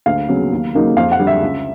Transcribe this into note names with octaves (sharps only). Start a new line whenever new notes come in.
D2 F5
C#3 F#3 B3
D#2
C#3 F#3 A#3 D#4
F2 F5
F#5
D3 G3
E5
C#2